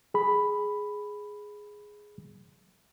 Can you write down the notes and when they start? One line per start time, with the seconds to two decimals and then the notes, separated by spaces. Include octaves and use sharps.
0.14 G#4 B5